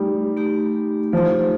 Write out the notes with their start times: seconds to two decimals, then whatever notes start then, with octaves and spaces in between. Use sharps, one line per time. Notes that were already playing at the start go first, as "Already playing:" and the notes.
Already playing: G3 A3 D#4 G4
0.37 A3 D#4 G4
1.13 F3 A3 D#4 G4